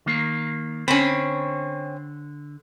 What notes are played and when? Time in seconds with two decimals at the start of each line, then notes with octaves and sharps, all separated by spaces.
0.06 D#3 A#3
0.88 D3 C4 C#4 B5